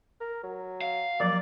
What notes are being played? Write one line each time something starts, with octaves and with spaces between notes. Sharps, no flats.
A#4
F#3
F5
F3 F#3 A#3 D5